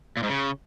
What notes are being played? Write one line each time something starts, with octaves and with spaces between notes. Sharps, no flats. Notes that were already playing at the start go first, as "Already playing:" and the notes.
A#2
G#2
C#3